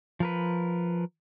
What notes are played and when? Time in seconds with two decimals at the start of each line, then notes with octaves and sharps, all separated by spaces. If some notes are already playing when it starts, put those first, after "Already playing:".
0.20 F3 A#4 B4